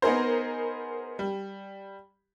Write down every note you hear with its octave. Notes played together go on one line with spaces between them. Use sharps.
B3 D#4 G#4 A#4 C5
G3